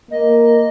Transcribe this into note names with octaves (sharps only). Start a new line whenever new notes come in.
A#3 D#5